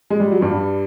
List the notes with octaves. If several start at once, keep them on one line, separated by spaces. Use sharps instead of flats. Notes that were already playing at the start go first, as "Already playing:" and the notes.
G#3
G3
F#3
G2 G3